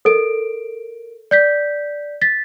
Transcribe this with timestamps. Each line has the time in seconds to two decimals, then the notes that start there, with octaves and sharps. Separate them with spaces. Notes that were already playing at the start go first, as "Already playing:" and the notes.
0.05 A4 A#4 D#5 D7
1.31 D5 G6 B6
2.22 A6 B6